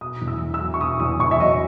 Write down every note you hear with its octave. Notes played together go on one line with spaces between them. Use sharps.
B2 D#6
E2
E6
E2
E6
F#3
C#6
B2 D#6
E2 D#6
E2 C#6
E5
F#3 D#5